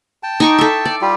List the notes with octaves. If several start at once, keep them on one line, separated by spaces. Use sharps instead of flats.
G5 A5
D#4 C#6 D6
A4 E5
D5
G3 F4 G4